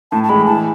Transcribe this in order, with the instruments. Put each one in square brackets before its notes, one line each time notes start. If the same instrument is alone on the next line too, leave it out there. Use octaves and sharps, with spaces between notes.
[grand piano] A2 [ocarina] A5
[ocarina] A5
[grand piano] E3 G#3 [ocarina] B5
[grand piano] E3 [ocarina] A5